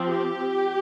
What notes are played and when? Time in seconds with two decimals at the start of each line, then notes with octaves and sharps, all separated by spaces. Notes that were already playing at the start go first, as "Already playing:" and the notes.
Already playing: F3 C4
0.10 G4